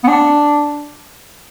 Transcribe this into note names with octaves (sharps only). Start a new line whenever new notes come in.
B3
D4